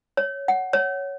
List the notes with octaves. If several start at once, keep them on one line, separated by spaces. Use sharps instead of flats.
C#5
F#5
C#5